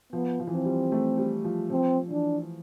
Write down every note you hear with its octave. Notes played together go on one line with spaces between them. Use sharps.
F3 B3
F3
E3
F3 C4
G3
A3
G3
F3
F3 C4
E3 D4